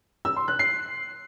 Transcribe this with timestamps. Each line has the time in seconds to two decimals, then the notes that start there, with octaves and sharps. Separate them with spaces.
0.25 E6
0.36 C6
0.48 F#6
0.59 C7